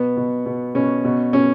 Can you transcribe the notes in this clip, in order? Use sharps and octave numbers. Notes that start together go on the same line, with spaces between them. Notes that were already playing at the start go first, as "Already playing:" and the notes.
Already playing: B2 B3
B2
B2
B2 C#4
B2
B2 C#4